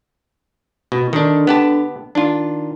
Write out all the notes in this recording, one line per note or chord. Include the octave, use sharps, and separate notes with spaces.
B2
D3 D#3 D4
B3 G4 A5
D#3 D4 F4